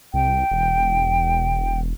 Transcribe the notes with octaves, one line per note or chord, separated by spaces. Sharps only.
C2 G5
E1